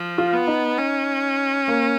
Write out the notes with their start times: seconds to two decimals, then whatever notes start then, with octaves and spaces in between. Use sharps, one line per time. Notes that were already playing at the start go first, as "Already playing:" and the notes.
Already playing: F3
0.18 F4
0.33 B3
0.47 D#4
0.78 C#4
1.68 A#3